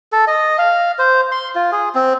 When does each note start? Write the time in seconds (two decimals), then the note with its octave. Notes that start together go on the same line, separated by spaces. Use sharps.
0.12 A4
0.28 D#5
0.58 F5
0.99 C5
1.32 C6
1.55 F4
1.72 G#4
1.95 C4